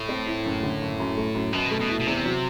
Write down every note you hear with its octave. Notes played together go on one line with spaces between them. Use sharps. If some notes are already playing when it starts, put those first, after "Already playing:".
Already playing: A2
C4
E4
F#1
D3
F#1
F#2
A3
F#2
F#2 B2
A3
B2
E4
B2
E2 C3
F#3